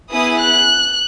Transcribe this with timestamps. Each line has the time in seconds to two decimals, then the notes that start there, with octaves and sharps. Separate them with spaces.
0.09 B3 E4 G#4 D#6
0.38 F#6